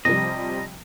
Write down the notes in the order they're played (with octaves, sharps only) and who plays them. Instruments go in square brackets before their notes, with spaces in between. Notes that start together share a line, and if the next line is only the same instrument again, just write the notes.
[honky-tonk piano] C3 F3 G3 [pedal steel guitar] D#5